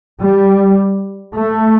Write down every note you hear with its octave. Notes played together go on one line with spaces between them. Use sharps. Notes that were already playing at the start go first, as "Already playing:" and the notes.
G3
A3